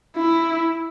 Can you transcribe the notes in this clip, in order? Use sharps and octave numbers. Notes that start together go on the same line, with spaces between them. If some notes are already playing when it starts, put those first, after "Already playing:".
E4